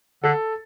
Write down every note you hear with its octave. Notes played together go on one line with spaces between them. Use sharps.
D3 A4